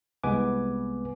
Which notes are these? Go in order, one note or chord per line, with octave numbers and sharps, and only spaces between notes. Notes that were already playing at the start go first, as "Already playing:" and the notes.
C2 G#3 B3 B4 G#5 D6